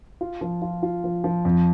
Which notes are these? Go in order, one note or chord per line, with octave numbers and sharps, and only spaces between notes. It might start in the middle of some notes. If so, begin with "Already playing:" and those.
F4
F3
F4
F4
F3
F3
F2